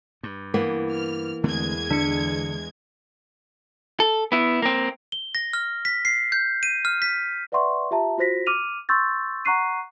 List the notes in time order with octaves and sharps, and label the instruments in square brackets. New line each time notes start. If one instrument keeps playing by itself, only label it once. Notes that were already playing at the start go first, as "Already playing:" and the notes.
[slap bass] G2
[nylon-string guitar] E3 A#3 B3
[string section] F6
[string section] E2 G#3 G#6 [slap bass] D3 A3 C4
[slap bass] D3 [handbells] D4 C#7
[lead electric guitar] A4
B3 E4
A#3 C4
[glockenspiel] G7
A#6
F6
B6
C7
G6
D#7
F6
B6
[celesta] B4 D5 E5 F#5 C6 C#6
F4 G4 E5 A5 A#5
F4 F#4 C5 A#6 B6
D6 F6 D#7 F7
C6 C#6 E6 G6 A6
F#5 A#5 C#6 F#6 C7 D#7